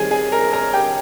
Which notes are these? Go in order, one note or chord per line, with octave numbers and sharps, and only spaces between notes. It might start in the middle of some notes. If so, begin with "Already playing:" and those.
Already playing: D#3 G3 C4 G#4 G#5
G#4 G#5
A#4 A#5
A#4 A#5
G4 G5